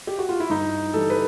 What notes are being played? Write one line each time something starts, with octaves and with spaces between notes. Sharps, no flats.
G4
F#4
F4
E4
G2 D#4
E3 G3 A4
B4